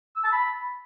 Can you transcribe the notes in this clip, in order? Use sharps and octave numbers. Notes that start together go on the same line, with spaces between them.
E6
A5
B5